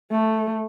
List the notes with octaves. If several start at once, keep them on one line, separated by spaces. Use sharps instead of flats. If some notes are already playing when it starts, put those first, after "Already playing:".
A3